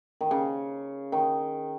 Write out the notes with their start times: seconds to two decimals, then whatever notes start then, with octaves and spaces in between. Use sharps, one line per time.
0.21 D#3
0.31 C#3
1.12 D#3